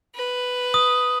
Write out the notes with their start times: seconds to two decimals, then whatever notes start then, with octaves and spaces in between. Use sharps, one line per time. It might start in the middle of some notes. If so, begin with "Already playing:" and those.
0.16 B4
0.74 D#6